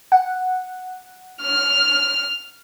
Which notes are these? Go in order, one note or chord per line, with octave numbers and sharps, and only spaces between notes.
F#5
F6